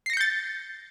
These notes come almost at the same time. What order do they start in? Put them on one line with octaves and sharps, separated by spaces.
C7 A#6 C#7 G6 A6